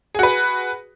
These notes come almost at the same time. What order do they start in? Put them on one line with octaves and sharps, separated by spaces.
G#4 F#4 B4